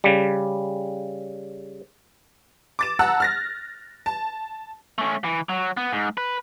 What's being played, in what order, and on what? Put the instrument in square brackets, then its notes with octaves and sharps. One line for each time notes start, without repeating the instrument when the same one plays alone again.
[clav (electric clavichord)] C#3 G3
[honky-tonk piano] D6 A6 E7
F#5 A5 A#5 E6 F#6
F6 A6 A#6
A5
[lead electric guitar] A3 C#4
E3
F#3
B3
G#2
B4